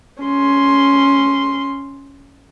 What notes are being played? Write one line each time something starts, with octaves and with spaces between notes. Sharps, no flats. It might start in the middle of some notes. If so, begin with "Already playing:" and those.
C#4 C6